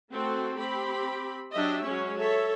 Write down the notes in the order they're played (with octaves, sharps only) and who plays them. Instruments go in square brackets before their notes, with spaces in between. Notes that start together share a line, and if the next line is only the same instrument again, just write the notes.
[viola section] A3 C4 F#4 A4
C4 G4 B5
F#3 D4 G4 D#5 E5
F#3 G#3 C#4 C#5
A4 C#5 E5